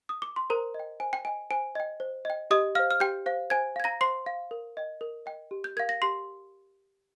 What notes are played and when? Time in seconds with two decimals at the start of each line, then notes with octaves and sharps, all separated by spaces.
0.09 D#6
0.22 D6
0.36 C6
0.50 A#4 C5 A#5
0.74 D#5
0.80 G5
1.00 C5 G#5
1.13 G5
1.25 D#5 G5 G#5
1.51 C5 G#5
1.75 D#5 G5
2.00 C5
2.25 D#5 G5
2.51 G4 D#5 D#6
2.75 F5 F6
2.79 C5
2.91 F6
3.00 G4 G5 G6
3.26 C5 F5
3.50 C5 G#5 G#6
3.76 F5 G#6
3.84 A#5 A#6
4.01 C5 C6 C7
4.26 F5
4.51 A#4
4.77 D#5 G5
5.01 A#4
5.26 D#5 G5
5.51 G4
5.64 G6
5.77 A#4 F5 G#6
5.89 A#6
6.02 G4 C6 C7